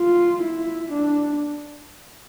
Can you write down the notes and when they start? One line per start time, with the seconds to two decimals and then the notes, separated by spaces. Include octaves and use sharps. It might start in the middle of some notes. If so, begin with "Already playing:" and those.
Already playing: F4
0.43 E4
0.92 D4